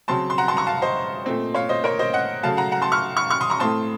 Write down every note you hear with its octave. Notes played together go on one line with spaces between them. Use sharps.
C#3 F#3 C4 A5 C6
C6
F#5 A#5
A5 C6
A#5 C#6
F5 A5
C5 D#5
A#2 A3 C4
C#5 F5
C5 D#5
A#4 C#5
C5 D#5
D#5 F#5
C#3 F#3 A3 F5 A5
F#5 A#5
F#5 A#5
A5 C6
C#6 F6
C#6 F6
C#6 F6
C6 D#6
A#5 C#6
A2 A3 C4 A5 C6